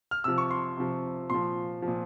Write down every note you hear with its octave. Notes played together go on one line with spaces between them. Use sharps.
F6
C3 F3 E6
C#6
C6
C3 F3
A#2 F3 C6
A#2 F3